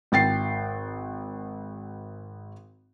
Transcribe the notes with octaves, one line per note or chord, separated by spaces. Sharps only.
G#1 G5 A6 C7